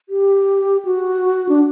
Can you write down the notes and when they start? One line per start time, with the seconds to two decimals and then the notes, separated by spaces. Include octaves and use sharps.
0.09 G4
0.85 F#4
1.49 D4